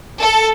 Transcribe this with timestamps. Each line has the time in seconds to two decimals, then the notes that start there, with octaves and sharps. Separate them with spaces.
0.20 A4